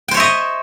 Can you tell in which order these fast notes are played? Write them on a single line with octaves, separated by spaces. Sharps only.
G5 C5 C#5 E5 D#5